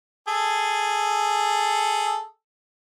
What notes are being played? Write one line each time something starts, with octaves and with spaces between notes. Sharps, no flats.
G#4 A4